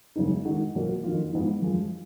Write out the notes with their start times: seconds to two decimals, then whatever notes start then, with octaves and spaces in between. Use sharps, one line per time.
0.16 F#2 C#3 G#3 B3 D#4
0.45 D#3 G#3 D#4 F#4
0.75 B2 F#3 A#3 F4
1.03 F2 D#3 F#3 A#3 F4
1.33 G#2 F3 B3 D#4
1.62 F#2 F3 G#3